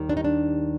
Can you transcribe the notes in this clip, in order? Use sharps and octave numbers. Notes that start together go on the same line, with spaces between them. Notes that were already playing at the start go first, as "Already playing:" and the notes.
Already playing: D#2 D#3 G3
D4
D#4
D4